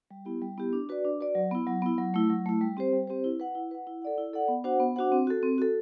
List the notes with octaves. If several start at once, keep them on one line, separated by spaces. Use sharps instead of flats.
G3
B3 E4 G4
G3
B3 E4 G4
D4
F#4 B4 D5
D4
F#4 B4 D5
F#3
B3 E4
F#3
B3 E4
F#3
A3 E4
F#3
A3 E4
G3
C4 G4 C5
G3
C4 G4 C5
E4
B4 F#5
E4
B4 F#5
E4
A4 D5 F#5
E4
A4 D5 F#5
B3
D4 F#4 C5 F#5
B3
D4 F#4 C5 F#5
C4
F#4 A4
C4
F#4 A4